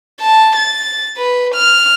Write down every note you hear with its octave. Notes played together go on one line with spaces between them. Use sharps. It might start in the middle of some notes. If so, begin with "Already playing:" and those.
A5
A6
B4
F6